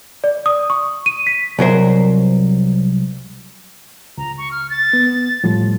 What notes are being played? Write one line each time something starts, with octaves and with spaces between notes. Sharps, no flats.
D5
D#6
C#6
D#7
B6
C2 F#3 A#4 C5
C#2 A#5
C#6
F6
A6
B3
A2 F3 G3